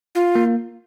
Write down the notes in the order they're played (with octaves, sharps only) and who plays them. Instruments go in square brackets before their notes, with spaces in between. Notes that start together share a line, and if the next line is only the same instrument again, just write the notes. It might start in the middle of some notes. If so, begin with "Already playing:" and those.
[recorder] F4
[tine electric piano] A#3